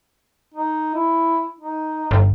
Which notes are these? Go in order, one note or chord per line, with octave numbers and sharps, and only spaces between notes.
D#4
E4
D#4
G1